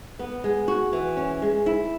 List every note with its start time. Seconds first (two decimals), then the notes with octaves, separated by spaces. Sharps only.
0.19 B3
0.44 G#3
0.68 F#4
0.93 E3
1.17 C#4
1.42 G#3
1.66 E4